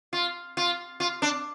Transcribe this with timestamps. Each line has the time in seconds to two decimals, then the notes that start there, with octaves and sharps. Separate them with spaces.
0.13 F4
0.57 F4
1.00 F4
1.22 D4